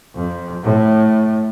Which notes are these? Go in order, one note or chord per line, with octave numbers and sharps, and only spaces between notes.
F2
A2